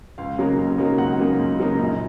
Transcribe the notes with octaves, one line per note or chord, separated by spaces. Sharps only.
C#2 F5
C#3 F#3 A#3 D#4
C#2
C#3 F#3 A#3 D#4
C#2 F#5
C#3 F#3 A#3 D#4
C#2
C#3 F#3 A#3 D#4
A#1 A#5